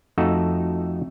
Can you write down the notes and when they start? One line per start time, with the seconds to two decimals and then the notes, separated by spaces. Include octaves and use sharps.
0.18 F2 A3 D#4 F#4 A4